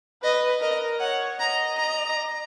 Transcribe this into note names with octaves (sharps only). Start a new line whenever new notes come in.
B4 D#5
A#4 D#5
C#5 F#5
D#5 A#5
A#5